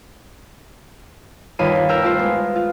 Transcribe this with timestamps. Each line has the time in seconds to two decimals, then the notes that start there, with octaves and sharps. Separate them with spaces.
1.59 G1 D#2 F4 B5 D#7
1.89 A#4 G5 E6 F6
2.02 A3 F4 C5
2.19 G#3 B3
2.56 F4